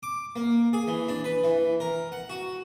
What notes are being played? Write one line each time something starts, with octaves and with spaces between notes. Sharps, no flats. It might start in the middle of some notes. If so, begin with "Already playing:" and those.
D6
A#3
G#4
E3
D4
B4
E3
A#4
F#5
F#4